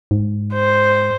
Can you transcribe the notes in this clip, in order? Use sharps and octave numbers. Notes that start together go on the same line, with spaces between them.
G#2
C5